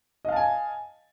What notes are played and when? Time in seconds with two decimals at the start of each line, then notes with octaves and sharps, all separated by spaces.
0.25 D#5
0.28 F5
0.32 A5
0.36 G#5